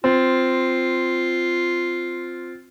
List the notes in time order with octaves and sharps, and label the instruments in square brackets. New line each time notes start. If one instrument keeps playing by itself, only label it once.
[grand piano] C4 [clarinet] F4